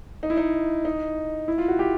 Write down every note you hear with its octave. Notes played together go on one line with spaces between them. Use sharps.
D#4
E4
D#4
D#4
E4
F4
F#4
G4